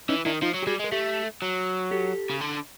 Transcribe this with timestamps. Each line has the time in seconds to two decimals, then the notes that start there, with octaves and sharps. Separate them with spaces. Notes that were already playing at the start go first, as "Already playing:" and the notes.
0.09 E3 C#4 D#4
0.25 D#3 D4 E4
0.42 F3 D#4 F4
0.54 F#3
0.63 G4
0.67 G3 F#4 G#4
0.80 G#3
0.84 A#4
0.92 A3 G4 A4
1.42 F#3
1.91 G4 A4
2.30 C#3
2.41 D3